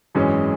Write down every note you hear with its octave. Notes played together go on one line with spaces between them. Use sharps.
G#1 F#2 E3 G#3 C#4